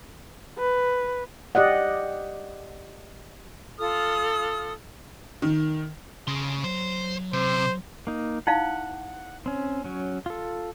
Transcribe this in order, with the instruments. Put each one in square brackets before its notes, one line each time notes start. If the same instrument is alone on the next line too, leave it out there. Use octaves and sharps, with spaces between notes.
[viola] B4
[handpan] G4 D5 D#5 F#5
[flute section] F4 A4 D#6 F6
[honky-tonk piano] D#3
[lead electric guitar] C#3 [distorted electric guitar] A3 C6
[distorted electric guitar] F#3 [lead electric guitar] C5
[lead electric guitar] C3 [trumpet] C5
[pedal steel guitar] A#3 D#4
[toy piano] D#4 E4 F5 [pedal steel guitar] F#5
[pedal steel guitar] C4 C#4
F#3 C#4
F4 A4